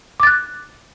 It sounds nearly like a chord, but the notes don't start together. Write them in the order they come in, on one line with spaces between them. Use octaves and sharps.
D6 A6 F#6